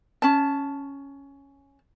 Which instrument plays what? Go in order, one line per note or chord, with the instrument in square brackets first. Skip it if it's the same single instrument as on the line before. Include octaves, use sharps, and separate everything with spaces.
[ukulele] C#4 A5